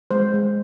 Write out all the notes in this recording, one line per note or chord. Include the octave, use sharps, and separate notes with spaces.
G#3 C5
G#3